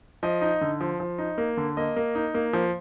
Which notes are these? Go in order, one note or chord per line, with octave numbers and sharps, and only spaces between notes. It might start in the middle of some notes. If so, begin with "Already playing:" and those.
F3 D#5
D#4
D3
F3
F3
D#4
A#3
D3
A#3 D#5
A#3
D#4
A#3
F3